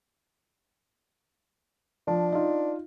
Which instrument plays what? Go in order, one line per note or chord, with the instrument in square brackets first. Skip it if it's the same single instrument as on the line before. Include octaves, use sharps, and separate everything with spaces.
[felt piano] F3 [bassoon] D4
[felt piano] D#4 F4